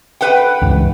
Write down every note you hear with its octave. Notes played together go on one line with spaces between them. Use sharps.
B4 F#5 G5
C#2 G2 E3